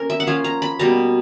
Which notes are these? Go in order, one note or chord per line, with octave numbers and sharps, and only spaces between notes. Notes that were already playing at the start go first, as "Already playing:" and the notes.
Already playing: A#3 C#4 A#4
E5
F#5
F3 A#3 C#4 F4 F5
A#5
B5
B2 G3 A#3 A#5